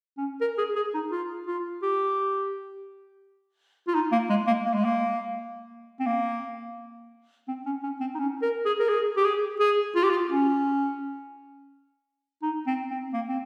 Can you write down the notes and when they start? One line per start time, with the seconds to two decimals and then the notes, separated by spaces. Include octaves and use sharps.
0.18 C#4
0.41 A#4
0.58 G#4
0.76 G#4
0.94 D#4
1.12 F4
1.47 F4
1.82 G4
3.88 F4
3.95 D#4
4.12 A#3
4.30 G#3
4.47 A#3
4.65 A#3
4.74 G#3
4.84 A#3
6.00 C4
6.06 A#3
7.48 C4
7.66 C#4
7.83 C#4
8.00 C4
8.15 D#4
8.19 C#4
8.42 A#4
8.66 G#4
8.80 A#4
8.89 G#4
9.17 G4
9.24 G#4
9.60 G#4
9.95 F4
10.03 G4
10.10 F4
10.31 C#4
12.43 D#4
12.67 C4
12.91 C4
13.14 A#3
13.28 C4